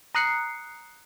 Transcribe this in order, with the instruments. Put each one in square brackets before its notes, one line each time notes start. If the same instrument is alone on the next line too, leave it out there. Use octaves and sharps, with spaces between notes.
[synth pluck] A#5 D#6 F#6 C7 C#7